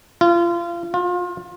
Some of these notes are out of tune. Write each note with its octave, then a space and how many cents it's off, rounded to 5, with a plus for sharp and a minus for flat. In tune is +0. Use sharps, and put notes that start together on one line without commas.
F4 -30
F4 +30